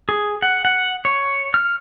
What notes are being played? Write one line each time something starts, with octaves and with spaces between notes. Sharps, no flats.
G#4
F#5
F#5
C#5
F6